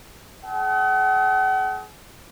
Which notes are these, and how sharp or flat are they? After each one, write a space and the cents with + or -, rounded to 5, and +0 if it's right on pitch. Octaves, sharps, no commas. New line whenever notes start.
G#4 +40 F#5 +40